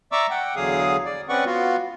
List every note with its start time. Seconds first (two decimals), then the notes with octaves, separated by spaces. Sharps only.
0.12 D5 E5 A#5 C#6 D6 E6
0.30 F#5 G5
0.56 E2 D3 F#3 G#4 F5 D#6
1.05 D5
1.29 C4 C#4 B4 D5 F#5 C#6
1.46 B3 F4 F#4